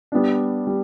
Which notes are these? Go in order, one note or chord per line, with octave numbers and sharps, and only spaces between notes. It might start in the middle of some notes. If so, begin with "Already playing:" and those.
G3 B3 D4
G3